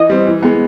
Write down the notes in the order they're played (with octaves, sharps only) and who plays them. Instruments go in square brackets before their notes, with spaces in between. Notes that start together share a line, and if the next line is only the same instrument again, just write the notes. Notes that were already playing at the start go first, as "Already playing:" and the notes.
Already playing: [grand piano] E3 [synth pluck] D#5
[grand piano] G3 C4
E3
G#3 B3